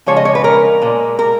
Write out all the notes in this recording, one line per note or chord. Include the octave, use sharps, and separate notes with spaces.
C#3 F3 G#3 C#5
D#5
C#5
B4
A#4
A#2 G#3
A#4